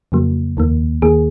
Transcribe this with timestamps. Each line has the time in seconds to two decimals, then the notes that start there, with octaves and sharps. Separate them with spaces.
0.12 F2 C#3 F#3 A#3
0.57 D#2 D#3 A#3
1.02 D#2 D#3 A#3 G#4